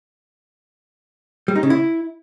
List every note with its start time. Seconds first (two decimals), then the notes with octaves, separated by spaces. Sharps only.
1.48 G3
1.56 D#4
1.63 C#3
1.70 E4